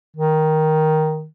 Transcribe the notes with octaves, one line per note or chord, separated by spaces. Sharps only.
D#3